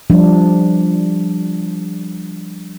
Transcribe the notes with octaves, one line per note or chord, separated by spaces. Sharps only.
F3 G3 D4